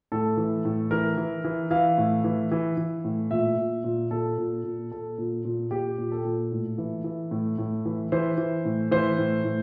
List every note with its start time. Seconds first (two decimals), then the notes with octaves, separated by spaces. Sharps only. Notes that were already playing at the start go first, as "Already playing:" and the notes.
0.12 A2 A4
0.37 E3
0.65 A2
0.91 E3 A#4
1.17 E3
1.44 E3
1.71 E3 F5
1.98 A2
2.24 E3
2.52 E3
2.77 E3
3.05 A2
3.31 A#2 E5
3.58 A#2
3.84 A#2
4.11 A#2 A4
4.38 A#2
4.64 A#2
4.92 A#2 A4
5.18 A#2
5.45 A#2
5.71 A#2 G4
5.98 A#2
6.12 A4
6.25 A#2
6.52 A2
6.78 E3
7.04 E3
7.31 A2
7.58 A2
7.85 E3
8.12 E3 C5
8.38 E3
8.65 A2
8.91 E3 C5
9.18 A2
9.44 A2